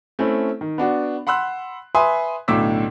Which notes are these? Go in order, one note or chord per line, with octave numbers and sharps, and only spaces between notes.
A3 C4 C#4 E4
D#3
B3 D4 F#4
F#5 B5 C6 E6 F#6
B4 E5 G#5 C6 D#6
B1 A2 D3 D6 E6 B6